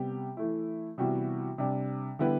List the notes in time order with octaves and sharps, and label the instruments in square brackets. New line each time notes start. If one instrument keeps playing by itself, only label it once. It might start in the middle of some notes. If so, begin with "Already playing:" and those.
Already playing: [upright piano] C3 G3 B3 G4
E3 A3 E4
C3 E3 G3 B3 F#4
C3 G3 D4
D3 G3 B3 E4 B4